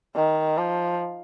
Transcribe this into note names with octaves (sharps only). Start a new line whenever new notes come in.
D#3
F3